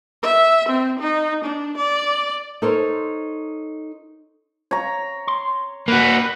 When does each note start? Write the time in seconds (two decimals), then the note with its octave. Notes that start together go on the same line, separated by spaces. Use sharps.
0.23 E5
0.69 C4
0.99 D#4
1.44 D4
1.77 D5
2.62 D#4 A4 A#4 C5 C#5
4.71 C#5 A#5
5.27 C6
5.88 A#3 F#4 B4